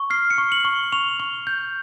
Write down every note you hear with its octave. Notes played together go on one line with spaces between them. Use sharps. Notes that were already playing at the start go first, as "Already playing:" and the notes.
Already playing: C#6
F6 C7
C#7
C#6
F#7
C#6
C#6 F7
C#6
G6